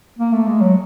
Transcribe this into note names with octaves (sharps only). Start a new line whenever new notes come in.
A#3
A3
G#3
F#3